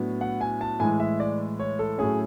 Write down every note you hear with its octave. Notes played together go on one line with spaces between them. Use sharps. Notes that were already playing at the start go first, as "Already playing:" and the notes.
Already playing: A2 F#3 B3 D4
F#5
G#5
A5
A2 E3 G#3 G#5
E5
D5
C#5
A4
A2 F#3 A3 C#4 G#4